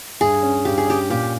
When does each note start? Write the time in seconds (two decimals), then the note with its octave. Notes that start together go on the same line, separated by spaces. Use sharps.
0.20 G2 G#4
0.43 C#4
0.65 G2 G4
0.78 G#4
0.87 C#4 G4
1.10 A#2 G4